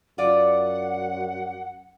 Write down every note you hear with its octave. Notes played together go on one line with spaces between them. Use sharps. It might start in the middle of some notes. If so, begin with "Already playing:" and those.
F#2 F4 D5 F#5